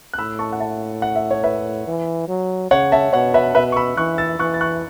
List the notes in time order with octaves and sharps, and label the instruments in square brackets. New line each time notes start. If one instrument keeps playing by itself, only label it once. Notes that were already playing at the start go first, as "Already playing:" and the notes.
[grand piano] F#6
[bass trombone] A2 [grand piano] B5 E6
[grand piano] A5 C#6
F#5
E5 A5
F#5
E5
C#5
B4 E5
[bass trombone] E3
F#3
[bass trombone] C#3 [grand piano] C#5 F#5
[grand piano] E5 A5
[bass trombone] B2 [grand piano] C#5 F#5
[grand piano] B4 E5
[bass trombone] B2 [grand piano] B4 E5
[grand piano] C#6
B5 E6
[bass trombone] E3 [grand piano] C#6 F#6
[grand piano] E6 A6
[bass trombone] E3 [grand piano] C#6 F#6
[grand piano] A6
C#6 F#6